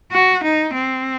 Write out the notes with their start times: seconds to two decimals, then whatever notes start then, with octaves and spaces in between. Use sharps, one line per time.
0.12 F#4
0.43 D#4
0.74 C4